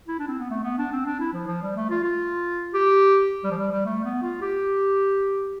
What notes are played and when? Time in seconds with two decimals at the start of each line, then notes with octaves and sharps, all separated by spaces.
0.08 E4
0.19 D4
0.28 C4
0.39 B3
0.50 A3
0.64 B3
0.78 D4
0.92 C4
1.06 D4
1.20 E4
1.33 F3
1.47 F3
1.62 G3
1.76 A3
1.90 F4
2.03 F4
2.74 G4
3.44 G3
3.51 F3
3.58 G3
3.72 G3
3.86 A3
4.05 B3
4.23 F4
4.42 G4